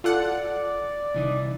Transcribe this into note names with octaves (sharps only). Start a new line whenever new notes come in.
F4 A4 D5 F#5
C2 E3 D#4